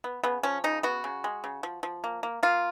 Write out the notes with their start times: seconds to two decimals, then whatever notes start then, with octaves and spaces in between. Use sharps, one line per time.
0.04 B3
0.24 C#3 B3
0.43 F3 C#4
0.64 C#3 D#4
0.83 B3 F#4
1.04 C#3
1.24 G#3
1.44 C#3
1.63 F3
1.83 F3
2.04 A#3
2.23 A#3
2.43 A#3 F4